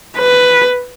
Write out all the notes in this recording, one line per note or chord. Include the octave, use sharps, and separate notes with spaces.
B4